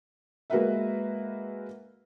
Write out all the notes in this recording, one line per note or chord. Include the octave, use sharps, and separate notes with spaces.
G#3 A#3 F#4 A#4 B4 E5